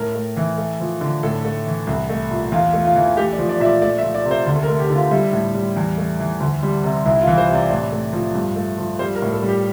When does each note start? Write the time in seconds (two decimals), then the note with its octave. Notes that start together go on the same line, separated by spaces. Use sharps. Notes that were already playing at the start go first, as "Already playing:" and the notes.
Already playing: A2 A#4
0.15 A3
0.37 E3
0.58 A3
0.80 F3
1.01 D3
1.23 A2 A4
1.45 A3
1.67 E3
1.87 C2
2.10 A3
2.31 A#2
2.52 E2 F4
2.73 A3
2.85 F4
2.95 E3
3.17 A3 G4
3.33 D5
3.39 F3
3.49 D5
3.60 A#2 E5
3.65 D5
3.82 A3 D5
3.98 E5
4.03 F3
4.15 D5
4.25 C3
4.31 C5
4.46 D2
4.56 A4
4.63 A#4
4.69 A3
4.80 G4
4.90 D3 F4
5.11 G3 E4
5.33 A2
5.55 G3
5.76 E2
5.98 A3
6.20 E3
6.40 D2
6.63 G3
6.84 C3
7.06 C2 E4
7.16 E4
7.21 F4
7.27 E3
7.38 C5
7.49 C3
7.55 D5
7.70 A2 D5
7.92 A3
8.13 F3
8.35 G2
8.56 A3
8.78 F3
8.99 G3 C5
9.15 A#4
9.22 A2
9.32 A4
9.43 G3
9.49 G4